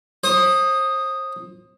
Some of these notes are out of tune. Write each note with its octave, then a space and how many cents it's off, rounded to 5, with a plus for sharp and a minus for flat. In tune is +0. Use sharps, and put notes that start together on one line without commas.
C5 +35 D#6 +0